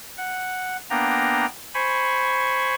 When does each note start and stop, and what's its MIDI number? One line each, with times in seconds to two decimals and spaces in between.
0.18 0.77 78
0.90 1.46 58
0.90 1.46 59
0.90 1.46 62
0.90 1.46 79
0.90 1.46 82
1.74 2.75 72
1.74 2.75 80
1.74 2.75 83
1.74 2.75 85